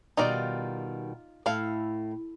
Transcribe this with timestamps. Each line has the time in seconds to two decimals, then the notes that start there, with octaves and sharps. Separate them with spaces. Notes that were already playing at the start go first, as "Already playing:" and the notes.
0.17 B2 D#3 G3 D#4 F4 D5
1.46 A2 E4 A4 F5